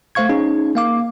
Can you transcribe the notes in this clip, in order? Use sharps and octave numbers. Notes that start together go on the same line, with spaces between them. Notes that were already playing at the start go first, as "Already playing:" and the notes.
A3 C5 F5 C#6 G#6
C#4 D#4 G#4
A#3 F5 D6